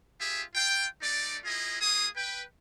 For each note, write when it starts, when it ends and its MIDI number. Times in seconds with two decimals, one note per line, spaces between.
0.20 0.43 65
0.20 0.43 67
0.20 0.43 68
0.20 0.43 76
0.54 0.84 65
0.54 0.84 79
1.01 1.37 57
1.01 1.37 63
1.01 1.37 74
1.44 1.80 64
1.44 1.80 65
1.44 1.80 68
1.44 1.80 75
1.80 2.06 58
1.80 2.06 65
1.80 2.06 68
1.80 2.06 87
2.15 2.42 71
2.15 2.42 79